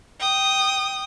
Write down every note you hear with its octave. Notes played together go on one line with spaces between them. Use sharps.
G5 D#6